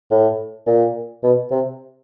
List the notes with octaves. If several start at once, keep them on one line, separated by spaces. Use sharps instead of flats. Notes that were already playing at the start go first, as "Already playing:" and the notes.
A2
A#2
B2
C3